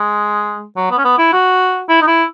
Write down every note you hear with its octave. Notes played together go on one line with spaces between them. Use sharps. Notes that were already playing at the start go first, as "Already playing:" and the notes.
Already playing: G#3
F#3
B3
C#4
B3
E4
F#4
E4
D#4
E4